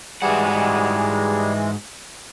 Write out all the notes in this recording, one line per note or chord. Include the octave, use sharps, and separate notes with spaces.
G#2 E3 G3 G#3 F#4 G#4 F#5